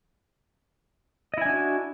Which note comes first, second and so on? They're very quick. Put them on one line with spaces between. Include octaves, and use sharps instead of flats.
D#5 E4 G#5 D4 F#4